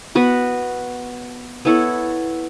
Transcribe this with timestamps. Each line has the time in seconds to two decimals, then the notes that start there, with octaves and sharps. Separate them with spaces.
0.15 B3 F#4 B4
1.65 B3 E4 A4 C#5